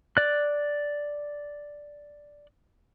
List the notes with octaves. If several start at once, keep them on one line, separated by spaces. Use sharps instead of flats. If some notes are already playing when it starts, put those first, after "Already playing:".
D5 F#6